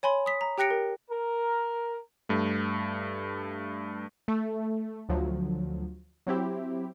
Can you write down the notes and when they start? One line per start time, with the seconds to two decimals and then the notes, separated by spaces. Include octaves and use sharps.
0.03 C#5 G#5 B5 C6
0.26 D#6 B6
0.41 A#5
0.58 G4 G5 F#6 A#6 C#7 D7
0.70 A#4
1.11 A#4
2.29 G2 A3
4.28 A3
5.09 D2 F3 F#3
6.27 F#3 C4 E4 G4